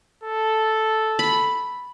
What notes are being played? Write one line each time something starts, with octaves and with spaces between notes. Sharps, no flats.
A4
B5